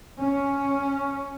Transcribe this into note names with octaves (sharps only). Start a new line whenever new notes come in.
C#4